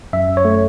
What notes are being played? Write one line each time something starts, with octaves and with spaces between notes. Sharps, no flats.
F#2 E5
C#5
A3